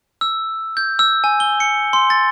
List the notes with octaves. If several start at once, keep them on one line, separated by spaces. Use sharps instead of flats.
E6
G6
E6
G#5
G7
C#7
C6
A6